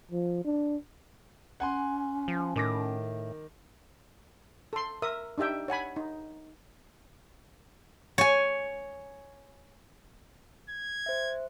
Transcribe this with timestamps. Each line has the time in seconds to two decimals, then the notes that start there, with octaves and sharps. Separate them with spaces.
0.11 F3
0.44 D4
1.60 C#4 F#5 G#5 C6
2.28 F3
2.56 A2 D#3 D6 A#6
4.73 A4 C6
5.02 A#4 E5 D#6
5.38 D4 D#4 G4 E5 G5
5.68 C#5 F#5 G#5 B5
5.96 D#4
8.18 C#5 G#5
10.69 G#6
11.06 C5 E5